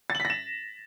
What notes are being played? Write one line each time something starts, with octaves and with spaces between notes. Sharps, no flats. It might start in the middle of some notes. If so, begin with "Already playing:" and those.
A6
F#7
B6
A#6
E7